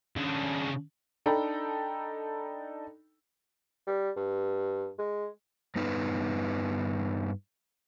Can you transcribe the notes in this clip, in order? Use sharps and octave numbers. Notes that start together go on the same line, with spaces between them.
C#3 D4
D4 D#4 A4 G5 A#5 B5
G3
G2
G#3
G2 B3 D#4 B4